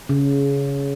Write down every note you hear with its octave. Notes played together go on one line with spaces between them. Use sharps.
C#3